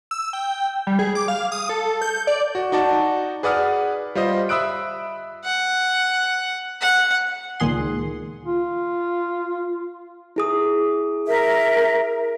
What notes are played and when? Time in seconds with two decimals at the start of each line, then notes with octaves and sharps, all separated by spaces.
0.11 E6
0.33 G5
0.87 G3
0.99 G#4
1.15 D6
1.28 F5
1.52 D#6
1.69 A4
2.02 G6
2.27 D5
2.55 F#4
2.72 D#4 F#4 D5 A5
3.43 G#4 B4 D5 F#5 D#6 F6
4.15 G3 F4 C5 D#5
4.49 E5 B5 D#6 E6 F#6 D7
5.45 F#5
6.82 F#5
7.60 C#2 A#2 D#3 G#4 C6
8.44 F4
10.36 E4 G#4 D#6
11.27 A#4 E5